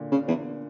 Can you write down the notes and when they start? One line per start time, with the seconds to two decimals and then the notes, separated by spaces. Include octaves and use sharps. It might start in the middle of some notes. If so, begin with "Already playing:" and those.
Already playing: A#2 D3
0.12 C#3
0.28 E2